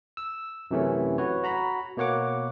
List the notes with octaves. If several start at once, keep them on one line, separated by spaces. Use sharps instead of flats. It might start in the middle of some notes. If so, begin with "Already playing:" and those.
E6
F#2 C3 E3 A3 C#4
F#4 B4 C#5
F#4 A#5 B5
B2 A#3 C#5 F#5 D6